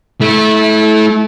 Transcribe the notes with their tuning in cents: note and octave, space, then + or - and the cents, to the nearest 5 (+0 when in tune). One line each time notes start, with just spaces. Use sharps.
A3 -25 E4 -20